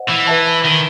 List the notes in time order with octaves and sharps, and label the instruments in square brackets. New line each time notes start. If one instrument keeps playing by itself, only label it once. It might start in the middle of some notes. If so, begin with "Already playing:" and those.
Already playing: [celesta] C5 D#5 F#5
[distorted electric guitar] E3
[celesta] B4 E5 A5
[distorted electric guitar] D#3